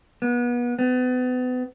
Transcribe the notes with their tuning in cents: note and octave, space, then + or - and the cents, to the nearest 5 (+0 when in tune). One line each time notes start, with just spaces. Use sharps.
B3 -30
B3 +35